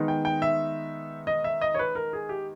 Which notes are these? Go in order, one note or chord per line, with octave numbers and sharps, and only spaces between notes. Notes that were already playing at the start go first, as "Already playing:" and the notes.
Already playing: D#3 G#3 B3 D#4
G5
G5
E5
D#5
E5
D#5
C#5
B4
A#4
G#4
G4